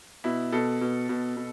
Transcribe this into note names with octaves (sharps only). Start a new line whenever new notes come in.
B2 E4
B2 A4
B2
B2
B2